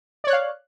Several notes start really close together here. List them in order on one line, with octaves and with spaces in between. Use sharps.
D5 C#5 F#6 F5